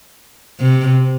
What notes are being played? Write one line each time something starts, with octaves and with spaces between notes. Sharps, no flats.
C3